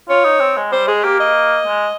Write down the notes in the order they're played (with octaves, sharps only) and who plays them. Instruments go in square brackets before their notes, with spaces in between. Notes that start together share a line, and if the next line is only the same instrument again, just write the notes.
[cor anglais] F4 [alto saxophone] C#5
[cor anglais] D#4
C4
G#3
[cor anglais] G3 [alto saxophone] C5
[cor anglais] G#3 [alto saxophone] G#4
[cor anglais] A#3 [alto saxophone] G4
[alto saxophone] D#5
[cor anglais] G#3